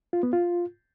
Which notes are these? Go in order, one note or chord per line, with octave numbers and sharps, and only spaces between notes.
F4
B3
F4